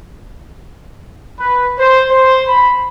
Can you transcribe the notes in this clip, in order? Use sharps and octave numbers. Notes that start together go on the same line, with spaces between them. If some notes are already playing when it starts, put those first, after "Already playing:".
B4
C5
C5
B5